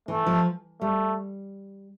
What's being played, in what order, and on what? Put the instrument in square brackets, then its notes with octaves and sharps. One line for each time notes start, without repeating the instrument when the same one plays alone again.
[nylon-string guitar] E3 [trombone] A3
[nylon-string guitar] F3
[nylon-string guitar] G3 [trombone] A3